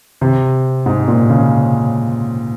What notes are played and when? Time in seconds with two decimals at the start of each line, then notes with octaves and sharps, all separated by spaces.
0.21 C3
0.86 G#2
1.08 A#2
1.30 C#3